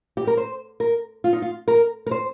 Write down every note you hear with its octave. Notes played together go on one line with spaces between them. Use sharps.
G4
A#4
C5
A#4
F4
D#4
F4
A#4
A#4
C5